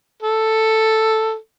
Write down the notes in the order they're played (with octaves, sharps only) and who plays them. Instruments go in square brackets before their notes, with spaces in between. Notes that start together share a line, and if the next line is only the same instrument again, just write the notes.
[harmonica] A4